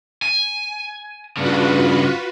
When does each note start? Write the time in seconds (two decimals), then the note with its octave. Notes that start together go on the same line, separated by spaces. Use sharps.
0.22 G#5
1.37 G2 C#3 F4 F#4 B4